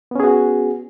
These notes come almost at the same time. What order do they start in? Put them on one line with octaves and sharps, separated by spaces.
B3 C#4 G#4 F#4